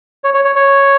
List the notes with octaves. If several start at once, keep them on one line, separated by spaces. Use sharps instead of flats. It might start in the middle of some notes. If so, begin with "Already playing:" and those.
C#5
C#5
C#5
C#5